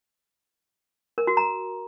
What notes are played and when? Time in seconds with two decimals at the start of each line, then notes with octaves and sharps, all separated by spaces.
1.18 A#4
1.27 F#4
1.37 A#5